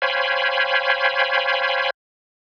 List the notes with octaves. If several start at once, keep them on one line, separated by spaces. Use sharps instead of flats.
C5 C#5 F5 G5 G#5 B5